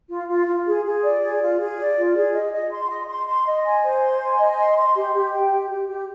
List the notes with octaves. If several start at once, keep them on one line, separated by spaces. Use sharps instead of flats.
F4
F4
F4
G#4
G#4
D5
G#4
F4
G#4
D5
F4
G#4
D#5
D#5
C6
D#5
C6
C6
D#5
G#5
C5
C6
G#5
D#5
C6
C6
G4
G4
G5
G4
G4
G4